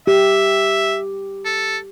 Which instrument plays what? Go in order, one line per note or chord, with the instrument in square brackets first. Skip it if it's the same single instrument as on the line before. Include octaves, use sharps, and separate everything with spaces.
[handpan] G4 [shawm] E5
[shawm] A4